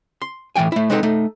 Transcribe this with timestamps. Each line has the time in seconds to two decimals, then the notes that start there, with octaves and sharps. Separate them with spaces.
0.22 C6
0.56 A2 E3 F3 G5 G#5
0.72 A3 E4
0.90 G#3 B3 C4 D#4 G#4 A4
1.03 A3 D#4